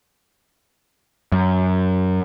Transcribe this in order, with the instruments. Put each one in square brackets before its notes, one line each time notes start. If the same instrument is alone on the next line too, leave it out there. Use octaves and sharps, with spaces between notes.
[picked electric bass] F#2